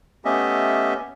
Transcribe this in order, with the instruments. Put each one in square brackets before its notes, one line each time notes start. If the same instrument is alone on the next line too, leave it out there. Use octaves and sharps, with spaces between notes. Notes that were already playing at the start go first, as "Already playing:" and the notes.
[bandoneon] A3 B3 C#4 G4 D#5 E5